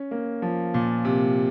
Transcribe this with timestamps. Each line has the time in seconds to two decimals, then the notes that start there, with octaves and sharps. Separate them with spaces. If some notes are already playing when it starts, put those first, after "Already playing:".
Already playing: C#4
0.11 A#3
0.42 F3
0.74 A#2
1.05 C3